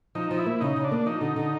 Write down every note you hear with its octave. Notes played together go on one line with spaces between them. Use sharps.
F3 D#4
F3
E4
A#3
C#3 D#4
C#3
D4
A#3
F3 D#4
D3
D3